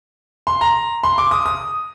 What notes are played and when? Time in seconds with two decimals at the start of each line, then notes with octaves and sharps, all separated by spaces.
0.47 C6
0.61 A#5
1.03 C6
1.18 D6
1.31 D#6
1.46 D#6